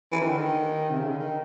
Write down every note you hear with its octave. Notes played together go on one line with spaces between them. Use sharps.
E3
D#3
D3
D#3
C3
C#3
D3
D#3